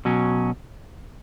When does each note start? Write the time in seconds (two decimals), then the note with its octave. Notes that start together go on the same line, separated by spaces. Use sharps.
0.05 B2 F#3 C#4